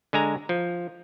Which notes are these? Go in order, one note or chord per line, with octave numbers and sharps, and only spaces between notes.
D3 G#3 G#5 A#5
F3